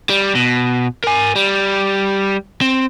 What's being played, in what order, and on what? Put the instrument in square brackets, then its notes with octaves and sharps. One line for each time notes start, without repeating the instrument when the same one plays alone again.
[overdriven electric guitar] G3
B2
A#4 G#5
G3
C4